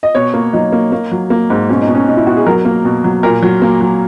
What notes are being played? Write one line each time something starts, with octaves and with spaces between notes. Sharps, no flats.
D#5
B2 C#5
A#3
F#3 D#4
A#3
A#3
F#3
A#3
G#2
B2 C#4
D#4
B2
C#4
B2 D#4
E4
B2 F#4
G#4
F#3 A#4
A#3
B2
F#3
A#2 A#4
F#3
A#3
F#3